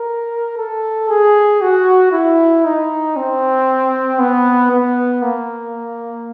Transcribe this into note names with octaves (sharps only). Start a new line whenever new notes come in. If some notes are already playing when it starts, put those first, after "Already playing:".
Already playing: A#4
A4
G#4
F#4
E4
D#4
C4
B3
B3
A#3